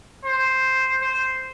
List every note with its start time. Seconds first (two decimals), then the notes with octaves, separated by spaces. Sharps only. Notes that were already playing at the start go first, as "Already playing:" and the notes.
0.24 C5
1.02 C5